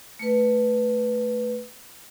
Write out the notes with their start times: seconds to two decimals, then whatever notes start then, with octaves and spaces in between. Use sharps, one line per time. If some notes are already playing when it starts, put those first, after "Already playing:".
0.19 A3 B4